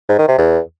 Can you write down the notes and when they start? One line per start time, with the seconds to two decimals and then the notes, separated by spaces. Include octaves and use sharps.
0.09 G#2
0.18 D#3
0.28 C3
0.38 E2